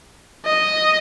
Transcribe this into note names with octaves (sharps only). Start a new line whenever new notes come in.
D#5